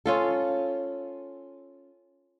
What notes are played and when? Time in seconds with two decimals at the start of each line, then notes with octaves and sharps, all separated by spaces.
0.06 C#4 F4 A4